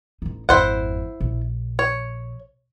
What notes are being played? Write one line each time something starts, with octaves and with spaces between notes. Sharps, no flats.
A1 D#4
G#1 F2 E4 C5 F#5
A#1
C#5